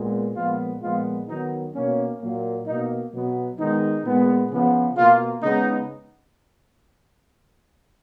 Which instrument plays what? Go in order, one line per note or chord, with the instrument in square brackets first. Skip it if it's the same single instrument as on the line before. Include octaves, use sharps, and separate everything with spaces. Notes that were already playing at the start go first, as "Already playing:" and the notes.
Already playing: [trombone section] A#2 G#3 B3
A#2 F3 G#3 B3 F4
A#2 F3 G#3 B3 F4
D#3 F#3 B3 D#4
B2 A#3 C#4
A#2 F#3 A#3
B2 A#3 D#4
B2 F#3 B3
D#3 G#3 B3 D#4
A#2 G#3 B3
C#3 F3 B3
B2 A#3 F4
C#3 G#3 B3 D#4